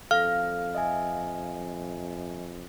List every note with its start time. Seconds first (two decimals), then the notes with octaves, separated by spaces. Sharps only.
0.11 F2 A4 F5 F6
0.75 D#5 E5 G#5